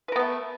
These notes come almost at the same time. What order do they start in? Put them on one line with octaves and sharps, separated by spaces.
B4 A#4 B3 A3